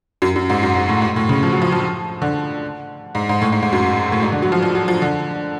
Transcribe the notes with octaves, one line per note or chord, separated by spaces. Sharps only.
F#2
F#2
G#2
F#2
G#2
A2
G#2
A2
C#3
F3
F#3
F3
F3
D3
G#2
G#2
A2
G#2
G#2
F#2
A2
G#2
D3
F#3
F3
F3
F#3
F3
D3